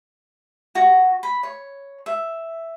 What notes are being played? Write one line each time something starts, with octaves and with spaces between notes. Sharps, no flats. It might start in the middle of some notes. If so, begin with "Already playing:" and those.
F#4
B5
C#5
E5